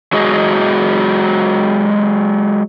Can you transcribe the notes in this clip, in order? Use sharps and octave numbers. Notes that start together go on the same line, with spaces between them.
F#3 G#3 F#4 G#4 D#5